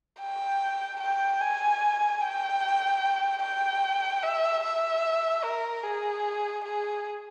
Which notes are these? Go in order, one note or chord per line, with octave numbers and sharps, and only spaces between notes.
G5
G5
G#5
G5
G5
E5
E5
A#4
G#4
G#4